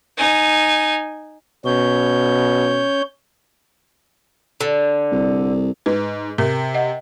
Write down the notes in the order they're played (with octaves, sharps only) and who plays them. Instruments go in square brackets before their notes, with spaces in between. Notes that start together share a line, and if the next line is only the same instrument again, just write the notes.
[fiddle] D#4 G#5
[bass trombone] B2 [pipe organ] C#4 C#5 G6
[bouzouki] D3
[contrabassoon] C2
[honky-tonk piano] G#2 [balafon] B4
[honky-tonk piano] C3 [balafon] A#4
[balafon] D#5 F#5